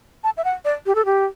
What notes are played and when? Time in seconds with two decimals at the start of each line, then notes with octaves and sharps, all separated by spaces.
0.24 A5
0.37 E5
0.45 F#5
0.65 D5
0.86 G4
0.95 A4
1.05 G4